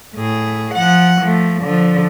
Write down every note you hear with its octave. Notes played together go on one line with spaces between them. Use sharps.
A2 G#4
F3 F#5
F3 A3
D3 F3